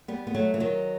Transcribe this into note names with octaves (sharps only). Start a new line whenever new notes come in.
G3 B3
B3
F#3 A3
E3
D#3 F#3